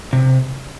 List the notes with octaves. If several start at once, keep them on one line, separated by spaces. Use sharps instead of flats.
C3